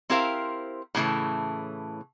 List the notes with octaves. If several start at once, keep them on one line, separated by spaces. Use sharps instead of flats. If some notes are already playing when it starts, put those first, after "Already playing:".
C4 E4 G4 A#4 C5 F5
A2 C#3 E3 A3